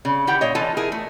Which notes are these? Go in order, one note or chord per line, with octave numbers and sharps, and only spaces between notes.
C#3
D#3 E4 G4 F#5 G5
A#2 C#5 D#5
E3 F4 A4 G#5 A5
E4 G#4 A#4
A3